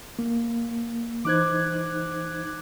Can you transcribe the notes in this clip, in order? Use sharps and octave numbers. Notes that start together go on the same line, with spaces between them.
A#3
E3 D#4 C5 D6 F#6 G#6